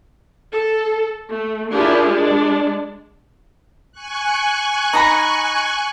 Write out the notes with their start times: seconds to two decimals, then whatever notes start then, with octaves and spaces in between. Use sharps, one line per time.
0.53 A4
1.28 A3
1.73 D4 E4 F4 G4 G#4 A#4
2.09 G#3 D4
3.92 G#5 C#6 F#6
4.93 D#4 A#5 B5